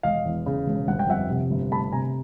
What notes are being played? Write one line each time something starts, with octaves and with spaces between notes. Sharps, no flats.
E1 D#5 F5
E2
C#3
E1
G1 F#5
G5
F2 E5 F#5
C3
G1
A3 A5 B5
C3 G#5 A#5